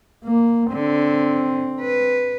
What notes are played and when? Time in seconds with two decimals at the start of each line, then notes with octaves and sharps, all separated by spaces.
0.24 A#3
0.73 D3 C4
1.81 B4